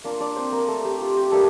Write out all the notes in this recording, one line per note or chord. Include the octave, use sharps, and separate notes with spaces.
A#3 D4 F4
D4 D5
C4 C5
A#3 A#4
A3 A4
G4
F4
G4
G3 A3 A#3 D4 A4